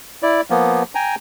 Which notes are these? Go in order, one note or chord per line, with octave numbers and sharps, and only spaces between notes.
E4 D5
F3 A#3 B3
G5 G#5 A#5